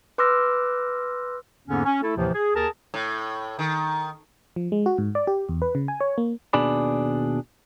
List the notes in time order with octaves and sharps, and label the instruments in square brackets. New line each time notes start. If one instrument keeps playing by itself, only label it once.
[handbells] B4 C6 D6 E6 F6 A#6
[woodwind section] E2 G#2 D3 A#3 B3 C#4
C#4
A3 E4 A4
D#2 A2 C3 E3 F3
G#4
D#2 G#4 A#4 A5
[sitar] A2
D#3
[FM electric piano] F3
G#3
F#4
G#2
D5
G4
E2
B4
C#3
G#5
C#5
A#3
[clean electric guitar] D#2 B2 D4 G#4 D5 B5